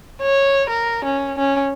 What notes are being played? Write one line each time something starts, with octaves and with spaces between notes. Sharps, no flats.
C#5
A#4
C#4
C#4